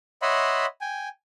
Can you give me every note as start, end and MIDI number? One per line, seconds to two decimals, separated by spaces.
0.22 0.66 73
0.22 0.66 75
0.22 0.66 76
0.22 0.66 78
0.22 0.66 83
0.22 0.66 84
0.81 1.08 79
0.81 1.08 80